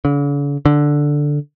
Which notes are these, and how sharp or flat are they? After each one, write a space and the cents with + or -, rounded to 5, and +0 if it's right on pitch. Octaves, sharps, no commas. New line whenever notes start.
D3 -45
D3 +0